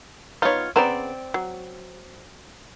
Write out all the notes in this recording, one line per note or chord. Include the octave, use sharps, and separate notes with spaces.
B3 D#4 F4 C#5
C#3 B3 C4 D5 A#5
F#3